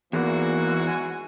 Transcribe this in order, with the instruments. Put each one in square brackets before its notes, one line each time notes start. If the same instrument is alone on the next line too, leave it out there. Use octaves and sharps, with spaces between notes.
[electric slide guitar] E2 [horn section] G#2 E3 F#4 [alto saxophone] A#3
[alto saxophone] G#5